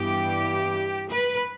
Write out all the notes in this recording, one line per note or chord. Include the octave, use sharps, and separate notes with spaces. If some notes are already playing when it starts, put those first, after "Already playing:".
Already playing: G2 E3 G3 B3 G4
B4